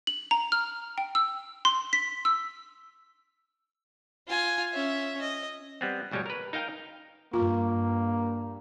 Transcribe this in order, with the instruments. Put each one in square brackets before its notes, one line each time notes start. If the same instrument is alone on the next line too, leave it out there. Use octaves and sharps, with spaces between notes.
[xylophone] F#7
A#5
F6
G5
E6
C6
B6
E6
[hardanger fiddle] F4 G#5
C#4 E5
D#5
[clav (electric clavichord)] G3 B3 C4
G1 B2 G3 G#3 C#5
A#4 B4
D#4 A#4 F5 G5
[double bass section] G2 [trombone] A#3 [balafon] F4